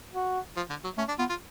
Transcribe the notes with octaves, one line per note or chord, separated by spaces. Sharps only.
F#4
F3
D3
F#3
A3 C#4
D4
B3 F4
F4